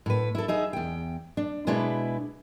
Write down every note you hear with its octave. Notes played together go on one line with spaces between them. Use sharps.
A2 B4
E4 A4
D#4 G#4 E5
E2 G5
D4
B2 G#3 D4 E4 B4